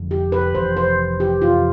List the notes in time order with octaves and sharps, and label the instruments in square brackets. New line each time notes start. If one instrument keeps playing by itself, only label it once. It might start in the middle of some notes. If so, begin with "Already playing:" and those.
Already playing: [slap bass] F1 F2 D3 G3
[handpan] G4
B4
[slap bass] F1 F2 E3 [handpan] C5
[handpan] C5
G4
[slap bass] F2 C3 E3 [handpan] F4